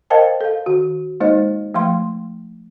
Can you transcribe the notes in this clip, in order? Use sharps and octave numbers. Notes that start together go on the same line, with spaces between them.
A#4 C5 D#5 F5 G5 A5
A4 F5
D#3 F#4
G#3 A#3 D#4 C5 D#5
F3 A3 F5 C6